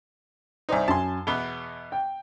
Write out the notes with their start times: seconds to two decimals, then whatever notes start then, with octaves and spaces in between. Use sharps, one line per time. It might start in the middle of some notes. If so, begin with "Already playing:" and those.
0.69 C2 D#4 C5 D5 G#5
0.88 F#2 G#5 A5 C6
1.27 E2 B2 B3 G7
1.92 G5